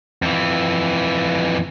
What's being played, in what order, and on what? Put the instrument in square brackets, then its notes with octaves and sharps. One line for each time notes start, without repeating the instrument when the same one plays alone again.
[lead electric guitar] F2 E3